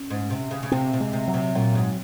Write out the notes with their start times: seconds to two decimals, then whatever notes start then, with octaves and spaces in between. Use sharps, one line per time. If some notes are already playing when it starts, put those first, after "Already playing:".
Already playing: C#4
0.10 G#2
0.30 C3
0.51 C#3
0.63 C#3
0.72 C3 C4
0.93 C3
1.00 G#3
1.13 C3
1.28 F#3
1.34 C3
1.55 A#2 F#3
1.75 G#2